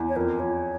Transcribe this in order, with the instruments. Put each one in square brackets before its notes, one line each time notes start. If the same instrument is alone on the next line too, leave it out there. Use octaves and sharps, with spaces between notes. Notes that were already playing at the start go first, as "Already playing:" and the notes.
Already playing: [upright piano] E2
[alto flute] C#5
[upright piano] F2 [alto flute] A#4
[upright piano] F2 [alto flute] C#5